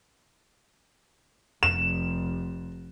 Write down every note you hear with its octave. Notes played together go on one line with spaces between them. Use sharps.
F1 E7